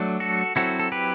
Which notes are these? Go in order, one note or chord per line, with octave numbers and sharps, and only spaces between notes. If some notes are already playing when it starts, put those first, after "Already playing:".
Already playing: F#3 A3 D4
F#4 A4
F#3 C4 E4 F#4 A4
A4
G4 B4